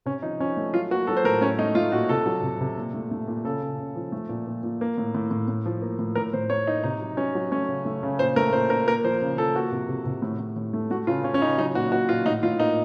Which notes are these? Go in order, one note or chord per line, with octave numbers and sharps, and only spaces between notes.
C3 C#4
F3 D#4
F3 C#4
A3
F#3 F4
A#3 F#4
F#3 A4
C5
A2 A#4
A3 C#4
A3 D#4
A3 F4
A#2 F#4
C3 A4
F#3
C3
C3
A#2
A3
A3
A#2
C#3 A4
C#3
C#3
F3
A3
A#2
A#2
A#2
A#3
A2
A2
A2
A2
F3
A#3
A2
A2 A#4
A2 C5
A2 C#5
A#3 D#4
C3 D#4
F#3
F#3 C#4
F#3
A3 C#4
C#3
A3
C#3
A#2 C5
A3 A#4
A#2 C5
A#2 A#4
A#3 A#4
F3 C5
C#3
F3 A4
A#3 F#4
C3
C3
C3
A2
A2
A2
A3
A3 F#4
C#3 F4
C#3 C#4
C#4
C#3 D#4
F#3 D#4
A#2 F#4
A#2 F#4
A#2 F4
A2 D#4
A2 F4
A#3 D#4